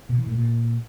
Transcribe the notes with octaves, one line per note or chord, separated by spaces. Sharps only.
B2
E3
A2
A#2